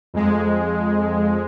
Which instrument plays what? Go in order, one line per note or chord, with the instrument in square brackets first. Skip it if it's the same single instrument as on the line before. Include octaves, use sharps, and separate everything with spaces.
[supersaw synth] F2 G#3